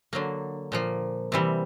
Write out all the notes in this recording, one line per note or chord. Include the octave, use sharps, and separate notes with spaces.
D3 F#3 A#3
A#2 F3 A#3
C3 E3 G3